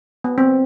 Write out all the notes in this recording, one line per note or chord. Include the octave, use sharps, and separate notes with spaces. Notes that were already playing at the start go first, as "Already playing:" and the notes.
B3
C4